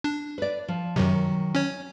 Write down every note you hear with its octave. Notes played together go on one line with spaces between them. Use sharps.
D4
B4 D5
F3
F#2 C3 D#3 F#3
C#4 C#5